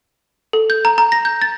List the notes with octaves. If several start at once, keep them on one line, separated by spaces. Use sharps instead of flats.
A4
G6
A#5
A#5
A#6
G6
A6